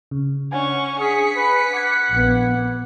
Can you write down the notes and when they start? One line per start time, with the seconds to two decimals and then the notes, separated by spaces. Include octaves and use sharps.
0.11 C#3
0.52 C#4 D4 F#5 G#5 C#6
0.99 G#4 B6 C#7
1.36 B4
1.73 F#5 D6 G#6
2.11 A#1 B3